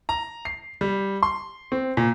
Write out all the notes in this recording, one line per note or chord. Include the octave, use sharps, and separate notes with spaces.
A#5
C7
G3
C6
C4
A#2